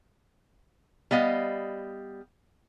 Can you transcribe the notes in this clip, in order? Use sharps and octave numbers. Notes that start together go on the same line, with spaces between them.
G3 B3 D#5 F5